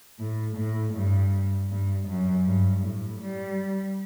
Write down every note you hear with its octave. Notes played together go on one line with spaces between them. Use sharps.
A2
A2
G2
G2
F#2
G2
A2
G3